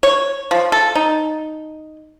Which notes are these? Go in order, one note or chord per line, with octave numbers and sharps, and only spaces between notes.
C#5
F3
A4
D#4